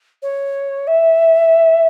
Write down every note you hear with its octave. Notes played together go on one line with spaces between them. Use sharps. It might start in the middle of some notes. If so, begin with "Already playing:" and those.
C#5
E5